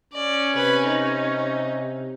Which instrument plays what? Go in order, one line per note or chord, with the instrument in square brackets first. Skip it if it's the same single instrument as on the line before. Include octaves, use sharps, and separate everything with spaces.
[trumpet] C#4 [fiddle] D5
[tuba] C3 [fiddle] B4 G#5
[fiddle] D#4